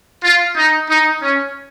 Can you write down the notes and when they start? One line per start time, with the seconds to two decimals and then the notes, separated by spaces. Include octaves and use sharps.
0.23 F4
0.56 D#4
0.89 D#4
1.22 C#4